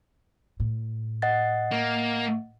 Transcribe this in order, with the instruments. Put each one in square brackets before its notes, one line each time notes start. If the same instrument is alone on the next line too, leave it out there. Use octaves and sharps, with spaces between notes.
[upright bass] A2
[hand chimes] D#5 F#5 A6
[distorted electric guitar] A#3